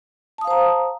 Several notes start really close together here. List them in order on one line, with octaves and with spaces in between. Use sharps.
A5 D#6 F5 C5 A#5